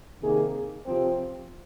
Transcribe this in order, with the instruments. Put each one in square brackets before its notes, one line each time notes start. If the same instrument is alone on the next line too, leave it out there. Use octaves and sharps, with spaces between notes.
[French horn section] C3 D#3 A#3 D#4 G#4
C3 F3 C4